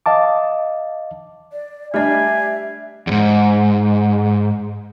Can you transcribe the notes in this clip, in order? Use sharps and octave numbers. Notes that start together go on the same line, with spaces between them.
D#5 F5 A5 D6
D5
G3 A3 D4 D#5 E5 G#5
E2 G#2